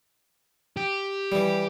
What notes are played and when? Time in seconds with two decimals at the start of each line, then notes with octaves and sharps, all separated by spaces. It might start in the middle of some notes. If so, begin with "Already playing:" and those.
0.77 G4
1.32 E3 G3